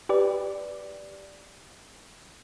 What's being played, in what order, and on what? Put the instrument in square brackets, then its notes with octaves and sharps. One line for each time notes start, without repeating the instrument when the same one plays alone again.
[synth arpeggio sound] G4 B4 D5